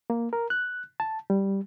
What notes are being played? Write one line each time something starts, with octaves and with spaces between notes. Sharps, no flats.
A#3
A#4
F#6
A5
G3